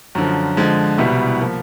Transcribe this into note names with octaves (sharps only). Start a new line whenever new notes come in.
F#2 D3 F3
D3 F3 G#3
C2 B2 G3 B3 E4
F3 A#3